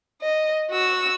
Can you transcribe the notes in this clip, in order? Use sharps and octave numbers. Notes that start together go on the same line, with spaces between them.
D#5
F#4 E6